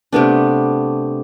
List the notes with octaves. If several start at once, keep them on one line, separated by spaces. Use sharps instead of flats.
C3 A3 B3 D4